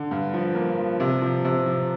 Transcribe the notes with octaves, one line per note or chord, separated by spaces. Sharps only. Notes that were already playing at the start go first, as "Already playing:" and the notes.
Already playing: D3
G2
F3
A#3
F3
C3
F3
C3
F3